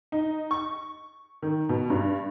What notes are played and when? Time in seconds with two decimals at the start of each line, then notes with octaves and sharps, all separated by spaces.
0.12 D#4
0.51 C#6
1.42 D#3
1.69 B2
1.90 G2